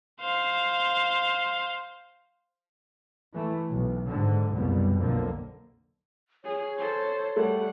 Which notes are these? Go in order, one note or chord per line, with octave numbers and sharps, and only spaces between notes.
C5 F5
E3 A3
B1
G#2 D3
F#1 C2 B2 G3
B1 F2 D3 A#3
G#4 C#5
A4 C5
G3 A3 F#5